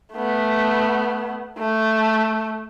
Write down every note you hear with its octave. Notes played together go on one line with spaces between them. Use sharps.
A3 B3
A3